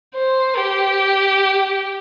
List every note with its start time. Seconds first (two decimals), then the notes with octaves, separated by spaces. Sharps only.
0.15 C5
0.57 G4